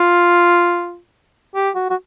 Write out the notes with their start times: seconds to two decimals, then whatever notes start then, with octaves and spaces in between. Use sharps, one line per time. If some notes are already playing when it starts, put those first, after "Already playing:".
Already playing: F4
1.55 G4
1.75 F#4
1.89 F#4